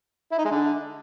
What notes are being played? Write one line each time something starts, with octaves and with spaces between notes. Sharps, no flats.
E4
D#4
G#3
D3